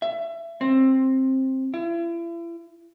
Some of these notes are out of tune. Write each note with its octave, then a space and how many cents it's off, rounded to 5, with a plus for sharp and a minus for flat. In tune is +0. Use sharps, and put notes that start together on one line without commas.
E5 +25
C4 +15
E4 +40